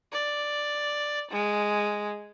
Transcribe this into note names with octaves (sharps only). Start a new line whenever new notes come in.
D5
G#3